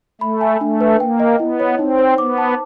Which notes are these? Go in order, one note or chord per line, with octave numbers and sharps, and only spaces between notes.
A3 B5
G#5
A3 D4
B4
A#3 G5
D#5
B3 E4
C#5
C4 D#4
C5
B3 D6
A5